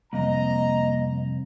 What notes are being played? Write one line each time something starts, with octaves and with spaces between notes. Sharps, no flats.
C2 F2 A#3 D#5 A#5